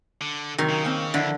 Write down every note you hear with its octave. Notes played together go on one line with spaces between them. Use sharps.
D3
C3 D#3 F#3 A#4
C#3
A#3 C4
F2 D3 E4